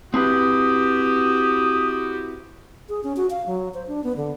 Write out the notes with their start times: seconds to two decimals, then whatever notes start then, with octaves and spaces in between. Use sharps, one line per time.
0.14 C4 E4 F#4 G4 B4 D#6
2.89 G#4
3.04 C#4
3.17 F#4
3.30 F5
3.47 F#3
3.74 C5
3.87 D4
4.04 B3
4.16 D3